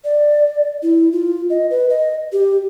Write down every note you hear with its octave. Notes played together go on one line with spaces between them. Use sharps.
D5
E4
F4
D#5
B4
D#5
G4